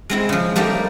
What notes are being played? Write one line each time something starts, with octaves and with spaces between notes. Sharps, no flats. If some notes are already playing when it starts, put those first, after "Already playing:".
G#3 C4 E4
C#3 F3
G3 A3 A#3 D#4 G4